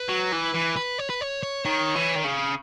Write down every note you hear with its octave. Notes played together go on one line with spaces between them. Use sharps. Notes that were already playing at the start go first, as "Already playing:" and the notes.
Already playing: B4
F#3
E3
E3
B4
C#5
B4
C#5
C#5
D#3 C#5
E3
D#3
C#3